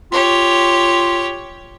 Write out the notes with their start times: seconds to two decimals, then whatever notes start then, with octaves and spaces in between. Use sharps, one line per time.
0.12 F4 G4 C#5